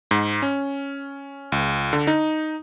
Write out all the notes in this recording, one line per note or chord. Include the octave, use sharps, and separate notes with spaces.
G#2
C#4
C#2
D3
D#4